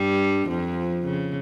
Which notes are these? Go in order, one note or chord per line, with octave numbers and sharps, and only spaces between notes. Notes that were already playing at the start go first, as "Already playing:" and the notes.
Already playing: G2 G3
F2 F3
C#3